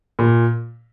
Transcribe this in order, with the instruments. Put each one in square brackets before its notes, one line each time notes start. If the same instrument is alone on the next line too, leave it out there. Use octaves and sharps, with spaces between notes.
[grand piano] A#2